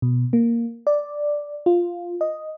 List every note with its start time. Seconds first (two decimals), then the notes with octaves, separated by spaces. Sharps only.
0.02 B2
0.33 A#3
0.87 D5
1.66 F4
2.21 D#5